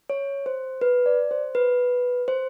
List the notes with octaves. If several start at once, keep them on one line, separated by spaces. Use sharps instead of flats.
C#5
C5
B4
D5
C5
B4
C5